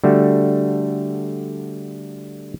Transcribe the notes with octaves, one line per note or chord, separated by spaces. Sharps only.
D3 G3 A3 F#4